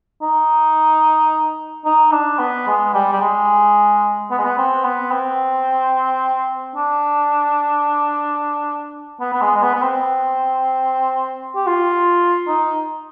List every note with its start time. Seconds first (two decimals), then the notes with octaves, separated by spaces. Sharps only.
0.22 D#4
1.85 D#4
2.12 D4
2.39 B3
2.67 G#3
2.94 G3
3.13 G3
3.21 G#3
4.31 B3
4.38 G#3
4.45 B3
4.58 C4
4.85 B3
5.12 C4
6.76 D4
9.20 B3
9.33 B3
9.41 G#3
9.56 G#3
9.62 B3
9.75 B3
9.83 C4
11.56 G4
11.67 F4
12.48 D#4